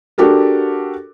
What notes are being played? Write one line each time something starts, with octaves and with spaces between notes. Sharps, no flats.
D4 F#4 G4 A4 A#4